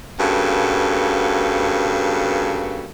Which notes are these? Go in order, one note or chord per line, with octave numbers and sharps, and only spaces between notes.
G2 C#3 A#3 B3 F#4 A4